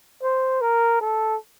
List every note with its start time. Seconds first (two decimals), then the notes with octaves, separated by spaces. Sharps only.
0.22 C5
0.61 A#4
1.00 A4